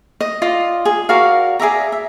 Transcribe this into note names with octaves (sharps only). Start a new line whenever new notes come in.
D#5
F4 D5 D#5
G#4
F#4 A#4 D5 F5
G#4 D5 E5 A#5
E5